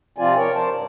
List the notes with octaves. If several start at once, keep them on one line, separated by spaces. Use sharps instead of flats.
C3 F3 C4 F4 D5 G#5
A#4 C#5 D5
C5 D5 A5
G2